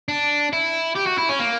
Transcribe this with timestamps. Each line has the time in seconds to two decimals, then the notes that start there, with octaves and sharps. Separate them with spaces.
0.09 D4
0.53 E4
0.95 G4
1.06 F#4
1.18 E4
1.29 C#4
1.39 A#3